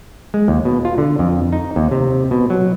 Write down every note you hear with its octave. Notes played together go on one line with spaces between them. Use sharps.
G#3
D#2
B2
F4
D3
F2
D#4
D#2
C3
B2
F#3